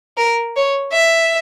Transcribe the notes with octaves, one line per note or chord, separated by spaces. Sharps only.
A#4
C#5
E5